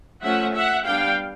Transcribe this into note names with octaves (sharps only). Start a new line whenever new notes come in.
F3 A3 C#4 E5 F#5
E5 F#5
G3 B3 D4 F5 G5